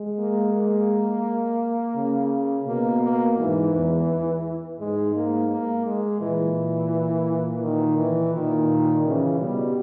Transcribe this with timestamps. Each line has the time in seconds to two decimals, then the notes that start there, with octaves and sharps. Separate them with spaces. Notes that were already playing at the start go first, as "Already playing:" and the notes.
Already playing: G#3
0.19 A#3
0.55 A#3
1.96 C#3
2.67 B2 A#3
3.02 A#3
3.37 G#2 E3
3.73 E2
4.80 G#2 G#3
5.15 A#3
5.50 A#3
5.86 G#3
6.21 A#2 E3
7.63 D#3
7.98 E3
8.34 A#2 D#3
9.05 C#3 E3
9.40 B2 G3